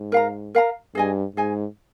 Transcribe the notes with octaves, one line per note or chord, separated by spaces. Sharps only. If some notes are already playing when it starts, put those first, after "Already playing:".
Already playing: G#2
A#4 F5 A#5
A#4 F5 A#5
G2 G#4 D#5 G#5
G#2 G#4 D#5 G#5